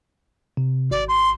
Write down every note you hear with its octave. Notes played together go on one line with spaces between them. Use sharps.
C3
G#1 D5
C6